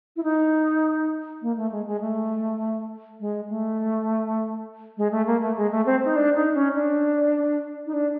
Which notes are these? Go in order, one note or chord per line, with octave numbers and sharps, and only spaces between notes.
E4
D#4
A#3
A3
G#3
G#3
A3
G#3
A3
G#3
A3
A#3
A3
G#3
A3
C4
D#4
D4
D#4
C#4
D4
D#4
D4